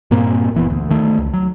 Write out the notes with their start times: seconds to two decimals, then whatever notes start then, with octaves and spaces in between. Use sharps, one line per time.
0.11 G2 A#2 A#3 C4
0.54 F#1 E3 B3
0.70 D2
0.90 D#3 A3
1.18 C#2
1.33 F#3